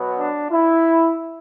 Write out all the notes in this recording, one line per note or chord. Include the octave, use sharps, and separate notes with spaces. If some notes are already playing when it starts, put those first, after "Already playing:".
Already playing: B2 F#3 B3
D4
E4